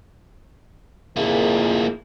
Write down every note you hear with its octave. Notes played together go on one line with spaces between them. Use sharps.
F2 A#2 A#3 E4 G#4